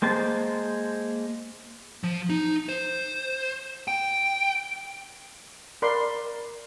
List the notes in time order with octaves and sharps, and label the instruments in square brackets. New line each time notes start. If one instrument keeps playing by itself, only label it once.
[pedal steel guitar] G#3 A#3 C5 A5
[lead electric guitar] F3
D#4
C5
G5
[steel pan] A#4 D5 B5 C6